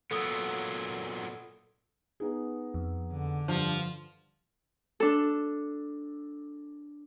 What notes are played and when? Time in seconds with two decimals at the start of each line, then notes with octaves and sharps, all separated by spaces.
0.11 A#2 F#3 B3 A4 D#6 E6
2.20 B3 D#4 G#4
2.74 F2
3.12 D3
3.48 G2 F3 G3
5.00 D4 A4